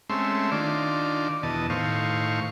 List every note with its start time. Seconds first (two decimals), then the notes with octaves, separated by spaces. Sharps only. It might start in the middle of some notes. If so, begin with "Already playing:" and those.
0.10 G#3 A3 C4 C#4 E5 C6
0.52 D#3 D4 F4 D5
1.43 E2 B2 D#5 A5
1.70 A2 D#3 C5 F5 C#6